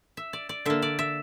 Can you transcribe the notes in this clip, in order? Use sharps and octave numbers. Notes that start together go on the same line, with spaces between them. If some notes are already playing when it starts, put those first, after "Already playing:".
E5
D5
D5
D3 A#3 E5
D5
E5